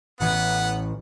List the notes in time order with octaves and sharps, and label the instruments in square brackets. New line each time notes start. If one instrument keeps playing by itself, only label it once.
[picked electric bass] A1 E3 [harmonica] B3 F#5